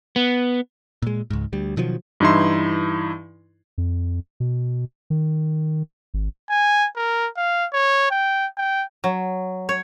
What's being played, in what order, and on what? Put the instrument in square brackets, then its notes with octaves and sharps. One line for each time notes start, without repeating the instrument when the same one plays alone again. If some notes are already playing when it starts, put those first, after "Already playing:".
[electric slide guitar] B3
[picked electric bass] A#2 G#3
C#2 G#2
D2 G3
B2 D#3 F3 F#3
[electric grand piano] G2 E3 D#4 E4 C6
[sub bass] F2
B2
D#3
G#1
[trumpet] G#5
A#4
F5
C#5
G5
G5
[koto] F#3
C#5